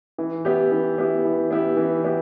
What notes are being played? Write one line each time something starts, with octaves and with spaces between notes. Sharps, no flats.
E3
B3 E4 G4
E3
B3 E4 G4
E3
B3 E4 G4
E3
B3 E4 G4